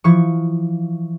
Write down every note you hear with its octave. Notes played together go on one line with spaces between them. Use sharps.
E3 F3 C#6